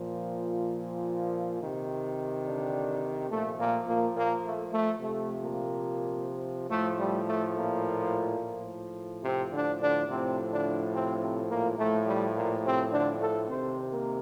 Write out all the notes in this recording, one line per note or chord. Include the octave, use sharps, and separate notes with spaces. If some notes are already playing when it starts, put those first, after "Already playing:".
Already playing: A#2 F3
C3 D#3
D3 D4
A#2 F3 A3
A#2 A#3
A#2 A#3
A#2 A#3
A3
A3
C3 F3 A3
A#2 A#3
A2 F3 A3
G3
A3
A#2 A#3
A2 F3
C3 C4
D3 D4
D3 D4
A2 C3 F3 C4
D3 D4
C3 C4
C3 C4
A#2 A#3
A2 F3 A3
G3
A#2 A#3
C3 C4
D3 D4
A3 A4
C3 D#3 C4 C5
A#3 A#4